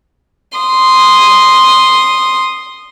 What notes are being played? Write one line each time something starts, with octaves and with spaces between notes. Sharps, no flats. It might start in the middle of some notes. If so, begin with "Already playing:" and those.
C6 D#6